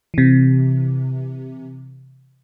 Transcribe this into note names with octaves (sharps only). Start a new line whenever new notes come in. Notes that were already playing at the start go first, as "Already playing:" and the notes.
C3 E3